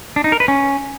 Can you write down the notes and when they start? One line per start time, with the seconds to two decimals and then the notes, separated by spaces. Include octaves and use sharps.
0.16 D4
0.24 D#4
0.32 A#4
0.40 B4
0.48 C#4